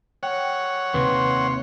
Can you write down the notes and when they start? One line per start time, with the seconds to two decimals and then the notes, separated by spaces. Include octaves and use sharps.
0.23 C#5 F#5 G5
0.94 D#2 A2 C3 B4 C6